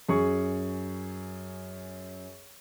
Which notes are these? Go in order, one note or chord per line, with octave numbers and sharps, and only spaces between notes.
F#2 G#4 C#6